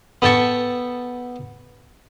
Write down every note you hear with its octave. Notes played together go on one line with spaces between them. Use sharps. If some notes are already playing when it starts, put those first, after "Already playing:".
B3 A4 G5 A5 C#6